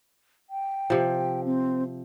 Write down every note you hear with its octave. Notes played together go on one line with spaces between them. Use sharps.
G5
C3 F3
C4